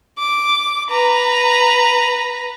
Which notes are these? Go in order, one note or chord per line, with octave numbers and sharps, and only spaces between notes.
D6
B4 A#5